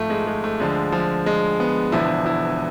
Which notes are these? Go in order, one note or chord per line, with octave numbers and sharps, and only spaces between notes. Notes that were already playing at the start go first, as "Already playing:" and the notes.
Already playing: G#1 G#2 F3 A3 F4
G#3
G#3
A3
D2 D3 F3 G#3
F3
G#3
B3
E1 E2 D3 F3 E4
E4